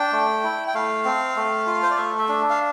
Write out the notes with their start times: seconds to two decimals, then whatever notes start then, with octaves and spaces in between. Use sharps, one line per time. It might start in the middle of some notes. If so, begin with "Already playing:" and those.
Already playing: D4 G5
0.12 A3
0.44 E4
0.68 G5
0.74 A3 F5
1.05 C4
1.36 A3
1.67 F4
1.83 C5
1.90 D5
1.97 A3 E5
2.18 E5
2.29 D4
2.50 F5